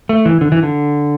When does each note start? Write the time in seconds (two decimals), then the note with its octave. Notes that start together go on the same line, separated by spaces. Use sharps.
0.09 A3
0.25 E3
0.41 D3
0.52 E3
0.63 D3